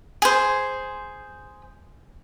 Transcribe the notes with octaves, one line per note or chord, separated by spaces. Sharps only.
G#4 C5